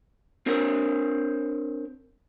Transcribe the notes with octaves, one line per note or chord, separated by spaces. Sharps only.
C4 D4 A#4 C5 C#5